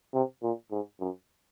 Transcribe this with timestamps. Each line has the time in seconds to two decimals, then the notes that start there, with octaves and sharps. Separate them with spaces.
0.14 C3
0.43 A#2
0.71 G#2
1.00 F#2